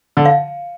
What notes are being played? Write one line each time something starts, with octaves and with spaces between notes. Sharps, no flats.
D3
F5